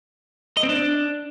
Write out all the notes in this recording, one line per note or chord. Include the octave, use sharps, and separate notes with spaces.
D#5
C4
D4